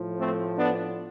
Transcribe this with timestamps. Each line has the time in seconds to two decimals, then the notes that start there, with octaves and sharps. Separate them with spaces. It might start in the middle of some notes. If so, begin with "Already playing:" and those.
Already playing: A2 F3
0.20 A3 C4
0.58 B3 D4